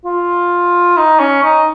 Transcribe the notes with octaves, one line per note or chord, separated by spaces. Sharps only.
F4
D#4
C#4
D#4